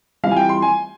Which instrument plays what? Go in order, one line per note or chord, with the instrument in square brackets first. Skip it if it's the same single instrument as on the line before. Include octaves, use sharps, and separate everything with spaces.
[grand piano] E3 G3 C4 F4 F5
G#5
G5
C6
G#5